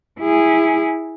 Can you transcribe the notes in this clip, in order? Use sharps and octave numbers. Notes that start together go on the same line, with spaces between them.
E4 G#4